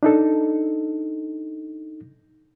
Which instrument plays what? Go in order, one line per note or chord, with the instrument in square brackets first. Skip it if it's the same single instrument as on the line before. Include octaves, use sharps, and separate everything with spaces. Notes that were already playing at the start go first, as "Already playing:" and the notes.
[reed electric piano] D4 D#4 A4